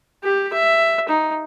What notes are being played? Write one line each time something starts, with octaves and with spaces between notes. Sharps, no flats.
G4
E5
D#4